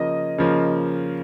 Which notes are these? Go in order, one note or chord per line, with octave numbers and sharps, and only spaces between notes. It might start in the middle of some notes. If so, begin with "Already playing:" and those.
Already playing: C#3 F3 A#3 D#5
C#3 F3 A#3